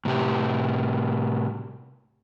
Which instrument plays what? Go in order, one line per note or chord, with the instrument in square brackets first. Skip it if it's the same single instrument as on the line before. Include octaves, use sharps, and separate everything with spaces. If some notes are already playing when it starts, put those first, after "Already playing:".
[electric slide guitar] A2 C3 G4